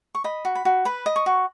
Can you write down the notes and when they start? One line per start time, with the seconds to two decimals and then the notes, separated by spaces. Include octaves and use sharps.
0.15 C#6
0.24 D#5 B5
0.45 F#4
0.55 B5
0.65 F#4
0.85 B4 B5
1.06 D#5
1.16 C#6
1.26 F#4